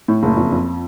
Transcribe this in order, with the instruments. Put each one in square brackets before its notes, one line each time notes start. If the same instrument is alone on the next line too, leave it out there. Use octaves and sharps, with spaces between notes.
[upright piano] A2
F#1
F2
F2